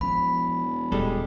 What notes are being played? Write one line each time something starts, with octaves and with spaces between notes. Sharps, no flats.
E1 F3 B5
D#1 G3 G#3 A4